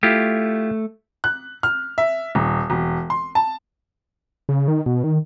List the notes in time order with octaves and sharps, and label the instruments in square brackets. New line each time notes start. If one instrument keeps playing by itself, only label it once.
[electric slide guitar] A3 [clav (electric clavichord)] E4 F4 G4
[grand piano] F#6
F6
E5
D#1
E1
C6
A5
[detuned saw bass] C#3
D#3
B2
D#3